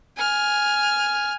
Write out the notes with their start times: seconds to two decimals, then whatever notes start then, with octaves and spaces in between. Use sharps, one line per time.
0.17 G#5 F6